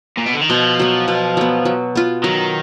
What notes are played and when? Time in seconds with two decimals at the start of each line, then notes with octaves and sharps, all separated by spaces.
0.17 A#2
0.26 B2
0.33 D3
0.41 D#3
0.49 B2 F3
0.79 F#3 B3
1.08 B2
1.37 F#3 B3
1.65 F#3
1.95 B3 F4
2.24 D#3 F#3